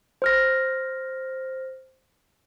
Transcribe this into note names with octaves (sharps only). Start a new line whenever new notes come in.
C5 F6 A#6